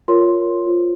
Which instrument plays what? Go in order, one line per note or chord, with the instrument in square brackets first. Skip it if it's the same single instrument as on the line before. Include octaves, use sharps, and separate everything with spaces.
[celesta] F4 A#4 C#5 C6
F4 C5